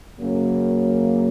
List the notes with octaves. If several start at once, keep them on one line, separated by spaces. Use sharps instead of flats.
F#2 C#3 F#3 A#3